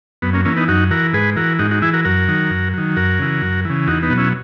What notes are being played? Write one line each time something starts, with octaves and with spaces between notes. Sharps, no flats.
F#2 B3
A#3 C#4
E3 A#3 C#4
B3 D#4
F#2 D#4 F#4
E3 F#4 A#4
G#2 G#4 B4
E3 F#4 A#4
G#2 D#4 F#4
D#4 F#4
E3 E4 G#4
F#4 A#4
F#2 F#4 A#4
D#3 F#3
F#2
D#3 F#3
F#2 F#4 A#4
C#3 E3
F#2
C#3 E3
E2 D#4 F#4
B3 D#4
B2 F#3
C#4 E4